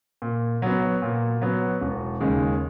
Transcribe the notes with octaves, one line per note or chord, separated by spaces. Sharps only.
A#2
F#3 B3
A#2
F#3 B3
E1
D#2 C#3 G#3